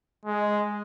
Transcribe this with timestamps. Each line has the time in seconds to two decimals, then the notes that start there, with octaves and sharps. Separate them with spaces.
0.25 G#3